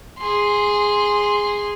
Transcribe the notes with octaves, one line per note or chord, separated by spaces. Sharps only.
G#4 C6